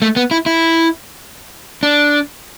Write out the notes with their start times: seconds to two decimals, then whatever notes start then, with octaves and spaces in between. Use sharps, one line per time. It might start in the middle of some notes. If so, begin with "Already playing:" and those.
0.02 A3
0.16 B3
0.31 E4
0.46 E4
1.83 D4